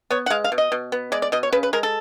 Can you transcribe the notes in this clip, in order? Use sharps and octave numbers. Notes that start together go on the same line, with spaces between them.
B3 C#5
F#5
G#3 F5
F5
B2
D#5
B2
B3
G#3 D5
D5
B2 D#5
C#5
C#3 B4
B4
G#3 A#4
A4